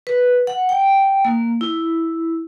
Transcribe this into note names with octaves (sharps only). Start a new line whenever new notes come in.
B4
F#5
G5
A#3
E4